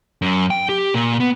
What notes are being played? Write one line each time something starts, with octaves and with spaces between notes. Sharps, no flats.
F#2
G5
G4
A#2
B3